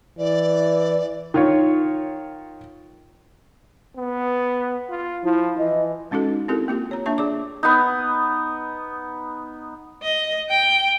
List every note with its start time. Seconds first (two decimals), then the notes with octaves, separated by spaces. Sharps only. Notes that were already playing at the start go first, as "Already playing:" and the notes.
0.19 E3 D5
1.34 D#3 F4 C#5
3.96 B3
4.90 F4
5.24 F3 E4
5.58 E3 D#5
6.11 G#3 C#4 D#4 F#4 A4
6.48 C4 E4 G4 A4 A#4
6.68 A#3 F4 G4
6.91 C#5 A#5
7.06 A#3 D4 E5 A5 C#6
7.18 G#4 D5 D6
7.63 B3 D#4
10.03 D#5
10.50 G5